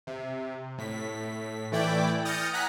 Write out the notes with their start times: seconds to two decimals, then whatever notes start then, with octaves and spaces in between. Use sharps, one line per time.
0.07 C3
0.78 A2 B6
1.72 E3 A3 E4 D5 G5 D6
2.25 D#6 F6 G6 A6 A#6 C#7
2.53 F#5 G#5 A#5 F#6 B6